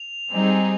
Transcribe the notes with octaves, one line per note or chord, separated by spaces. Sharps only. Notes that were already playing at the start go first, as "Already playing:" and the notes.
Already playing: F7
G3 C4 D#4 G#4